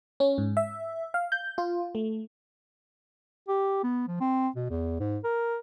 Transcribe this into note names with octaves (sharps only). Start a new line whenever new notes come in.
C#4
G#2
E5
F5
G6
F4
A3
G4
B3
F3
C4
B2
E2
G#2
A#4